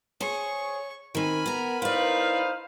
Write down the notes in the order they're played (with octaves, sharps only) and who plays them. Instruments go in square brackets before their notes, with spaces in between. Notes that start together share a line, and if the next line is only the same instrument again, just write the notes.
[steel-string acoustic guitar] G#4 C5 [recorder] C#5 [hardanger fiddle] C#6
[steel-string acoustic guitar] D#3 C4 [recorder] A#4 [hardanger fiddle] G#5 B5
[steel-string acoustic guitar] B3 A#5
[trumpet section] D#4 C5 F5 [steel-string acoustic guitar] E4 D5 [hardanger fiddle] B4